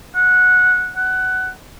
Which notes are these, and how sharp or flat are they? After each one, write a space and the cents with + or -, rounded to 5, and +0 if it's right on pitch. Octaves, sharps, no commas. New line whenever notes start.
F#5 -10
F#5 +15